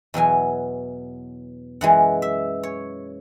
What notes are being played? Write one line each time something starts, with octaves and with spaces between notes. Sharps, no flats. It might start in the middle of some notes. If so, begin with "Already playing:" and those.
E2 B2 F#3 G#5
F#2 E3 G#3 F#5
E5
C#5